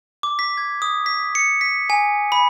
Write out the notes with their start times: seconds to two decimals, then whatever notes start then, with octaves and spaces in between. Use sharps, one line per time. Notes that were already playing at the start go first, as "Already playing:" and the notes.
0.23 D6
0.39 B6
0.57 G#6
0.82 D#6
1.06 B6
1.35 C#7
1.61 B6
1.90 G#5
2.32 B5